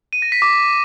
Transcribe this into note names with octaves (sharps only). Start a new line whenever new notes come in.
D#7
A#6
B6
D6